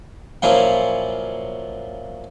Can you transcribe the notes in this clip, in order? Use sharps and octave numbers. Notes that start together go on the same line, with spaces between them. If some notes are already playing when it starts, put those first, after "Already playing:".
A#2 F3 F#3 C#4 E4 F4